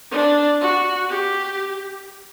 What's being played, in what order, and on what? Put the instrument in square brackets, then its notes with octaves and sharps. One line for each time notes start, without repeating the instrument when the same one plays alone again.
[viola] D4
F#4
G4